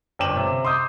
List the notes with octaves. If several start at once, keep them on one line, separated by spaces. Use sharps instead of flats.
G1 C#4 G5 D6 E7 F#7
C3
C6 D6 D#6 G6